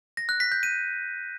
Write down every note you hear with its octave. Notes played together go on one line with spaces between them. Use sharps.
A#6
F#6
B6
G6
D#7